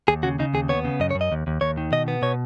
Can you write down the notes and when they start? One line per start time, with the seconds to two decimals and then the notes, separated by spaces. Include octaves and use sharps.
0.08 D#2 G#4
0.23 C#3 F#4
0.39 C#3 D#4
0.54 D#2 G#4
0.69 B3 C#5
0.85 C#3
1.00 F#2 D#5
1.11 C#5
1.15 F#2
1.21 D#5
1.32 D#2
1.47 D#2
1.61 D#2 C#5
1.77 D#3
1.92 B2 D#5
2.08 B3
2.22 B2 C#5